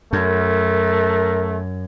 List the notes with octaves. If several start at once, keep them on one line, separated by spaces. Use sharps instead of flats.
F#2 A3 A#4